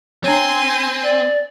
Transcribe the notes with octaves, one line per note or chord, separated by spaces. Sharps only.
C4 D4 C#5 G#5 C6
D5